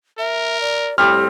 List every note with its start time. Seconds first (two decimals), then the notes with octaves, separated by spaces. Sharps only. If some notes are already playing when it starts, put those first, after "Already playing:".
0.19 A#4 E5
0.61 D5
0.98 A2 G3 C4 G4 F6